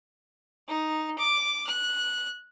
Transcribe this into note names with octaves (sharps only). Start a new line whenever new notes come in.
D#4
D6
F#6